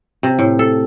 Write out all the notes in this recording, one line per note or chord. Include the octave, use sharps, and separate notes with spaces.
C3
A2
A4